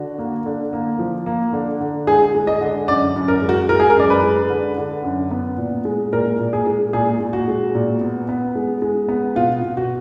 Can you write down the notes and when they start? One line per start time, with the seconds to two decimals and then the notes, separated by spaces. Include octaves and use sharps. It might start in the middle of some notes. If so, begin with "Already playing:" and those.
Already playing: D3 F#4
0.19 A#3
0.46 D3
0.73 A#3
0.99 F3
1.26 A#3
1.53 D3
1.80 D3
2.07 G#3 G#4
2.35 G#3
2.47 D#5
2.61 D3
2.88 F#2 D5
3.16 F#2
3.28 A#4
3.42 G#3
3.49 F#4
3.69 G#3 A#4
3.80 G#4
3.90 A#4
3.96 F#2 D5
4.10 B4
4.24 G#3
4.50 D3
4.78 D3
5.04 F#2
5.31 B3
5.58 A#2
5.85 G#3
6.12 A#2 A#4
6.39 A#2
6.53 G#4
6.67 G#3
6.93 A#2 G#4
7.20 A#2
7.33 F#4
7.48 G#3
7.75 A#2
8.01 B3
8.29 B3
8.55 G#3
8.82 G#3
9.08 B3
9.35 B2 F4
9.63 B2
9.77 F#4